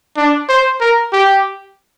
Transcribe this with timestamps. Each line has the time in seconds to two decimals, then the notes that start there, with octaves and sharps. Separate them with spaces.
0.17 D4
0.49 C5
0.81 A#4
1.13 G4